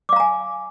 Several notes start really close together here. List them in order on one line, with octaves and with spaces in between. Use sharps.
D6 F5 A#5 G#5